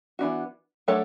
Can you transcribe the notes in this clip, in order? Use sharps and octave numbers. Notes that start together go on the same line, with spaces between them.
E3 B3 D4 F#4
F#3 A3 D4 A4 C#5